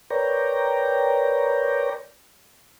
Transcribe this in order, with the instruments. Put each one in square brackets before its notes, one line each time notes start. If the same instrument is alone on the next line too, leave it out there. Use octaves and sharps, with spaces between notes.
[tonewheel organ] A#4 B4 C#5 D5 G5 A#5